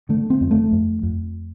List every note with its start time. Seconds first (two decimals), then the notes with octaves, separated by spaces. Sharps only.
0.09 D3 A3
0.30 C4
0.41 F2
0.51 A3
0.72 F2
1.03 F2